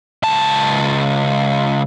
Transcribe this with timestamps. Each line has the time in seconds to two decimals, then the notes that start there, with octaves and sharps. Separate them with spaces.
0.23 C#2 A5